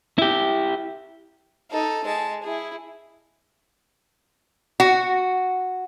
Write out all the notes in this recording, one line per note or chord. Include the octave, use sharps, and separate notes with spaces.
E4 G4
D#4 A4
G#3 A5
E4 G#4
F#4